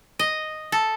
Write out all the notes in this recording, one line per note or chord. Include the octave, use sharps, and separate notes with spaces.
D#5
A4